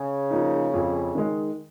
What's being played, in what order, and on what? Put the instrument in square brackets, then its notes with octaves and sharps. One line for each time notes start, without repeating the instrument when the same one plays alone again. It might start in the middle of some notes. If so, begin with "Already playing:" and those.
Already playing: [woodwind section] C#3
[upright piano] F3 A#3 D#4
F2
D#3 G#3